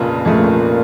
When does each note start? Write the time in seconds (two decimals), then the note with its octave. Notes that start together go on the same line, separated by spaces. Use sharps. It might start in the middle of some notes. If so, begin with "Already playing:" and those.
Already playing: F1 F2 A#2 C#3
0.25 F1 F2 C#3 A3